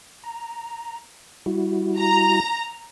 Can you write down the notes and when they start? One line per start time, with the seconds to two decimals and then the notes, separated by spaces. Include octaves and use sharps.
0.24 A#5
1.46 G3 E4 F#4
1.97 A#5